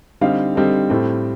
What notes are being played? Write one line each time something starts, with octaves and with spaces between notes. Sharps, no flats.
D3 G3 C4 D#4 F5
D3 G3 C4 D#4 A4
A2 G3 C4 A4